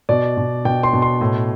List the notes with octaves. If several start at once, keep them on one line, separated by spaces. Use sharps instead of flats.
B2 D5
B2
B2 G5
C6
B2
C6
A2